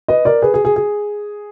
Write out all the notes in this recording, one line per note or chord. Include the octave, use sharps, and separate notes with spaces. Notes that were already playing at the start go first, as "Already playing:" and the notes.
B4 D#5
A#4 D5
G#4 B4
G#4
G#4
G#4